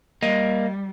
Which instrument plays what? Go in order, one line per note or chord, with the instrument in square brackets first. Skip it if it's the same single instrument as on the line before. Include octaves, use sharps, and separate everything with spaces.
[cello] G3 [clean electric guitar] A#3 [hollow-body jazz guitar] D#5